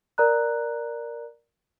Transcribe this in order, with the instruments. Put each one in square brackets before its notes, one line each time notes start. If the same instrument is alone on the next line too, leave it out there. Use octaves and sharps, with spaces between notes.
[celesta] A#4 D5 A#5 F#6